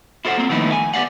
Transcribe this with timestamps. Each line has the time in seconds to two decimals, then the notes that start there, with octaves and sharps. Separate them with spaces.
0.25 E4 F4 A4 C5 F#5
0.37 A#3 C4
0.49 D#3 F3 A3 B3 D#4 E4
0.72 G#5
0.94 B3 G4 D5 F5 F#5